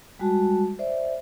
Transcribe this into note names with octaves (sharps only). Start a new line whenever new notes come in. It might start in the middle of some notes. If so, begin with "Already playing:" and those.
G3 G#3 F#4 A5
C5 D5 E5